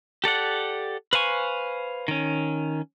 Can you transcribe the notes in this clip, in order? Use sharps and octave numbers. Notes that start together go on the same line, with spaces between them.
G4 A4 D5 F#5
B4 C5 F5 G#5 C#6
D#3 C#4